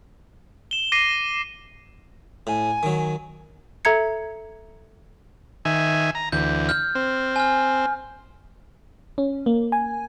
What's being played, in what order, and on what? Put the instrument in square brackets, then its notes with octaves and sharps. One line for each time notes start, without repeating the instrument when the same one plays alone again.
[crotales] E7 G7
D6 A#6 C7 D#7
[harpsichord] A2 [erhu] G#5
[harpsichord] D#3 F#3
[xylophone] A4 E5 A#5 G#6 C#7
[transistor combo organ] D#3 E5 G#5
A#5
[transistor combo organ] D2 E3 [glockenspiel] G6
[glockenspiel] F6 G6
[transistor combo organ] C4
[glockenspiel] G#5 F6
[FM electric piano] C#4
A#3
G#5